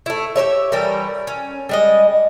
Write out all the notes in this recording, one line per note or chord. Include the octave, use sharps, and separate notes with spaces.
A3 E4
G4 B4 C#5 E5
E3 G3 A3 A#4
C#4
G3 G#3 D#5